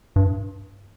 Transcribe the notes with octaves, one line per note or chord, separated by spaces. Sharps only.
G2